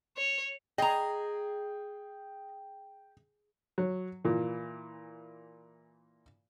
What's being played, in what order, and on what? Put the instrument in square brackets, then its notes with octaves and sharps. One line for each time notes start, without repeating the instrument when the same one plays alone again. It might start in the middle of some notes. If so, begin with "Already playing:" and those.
[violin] C#5
[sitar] G#4 [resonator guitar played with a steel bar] D#5 A#5 [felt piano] G5
[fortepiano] F#3
A#2 E3